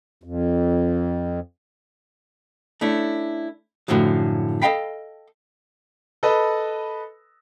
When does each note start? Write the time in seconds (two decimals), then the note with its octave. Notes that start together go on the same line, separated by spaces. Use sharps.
0.24 F2
2.81 A3 C#4 D4 E4
3.88 F#2 A2 D3 F3 F#3
4.62 A4 B4 D#5 F5 G5 B5
6.23 A4 B4 D#5 A5 B5